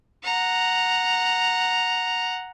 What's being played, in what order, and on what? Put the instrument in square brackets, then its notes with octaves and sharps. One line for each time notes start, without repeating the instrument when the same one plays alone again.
[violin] F#5 A#5